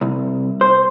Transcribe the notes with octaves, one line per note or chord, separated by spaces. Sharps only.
C2
C5